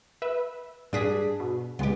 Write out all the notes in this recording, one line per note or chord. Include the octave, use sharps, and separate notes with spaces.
B4 E5
G2 D4 G#4 B6
B2
C#2 G#3 B3 G4